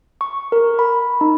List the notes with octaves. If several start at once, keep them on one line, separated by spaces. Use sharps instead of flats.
C#6
A#4
B5
D#4